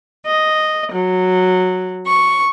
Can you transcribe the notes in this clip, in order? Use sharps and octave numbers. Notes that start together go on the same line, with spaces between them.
D#5
F#3
C#6